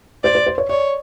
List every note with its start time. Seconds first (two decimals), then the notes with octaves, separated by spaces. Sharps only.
0.24 C5 D5
0.35 C5
0.47 C5
0.58 C#5
0.69 C#5 D5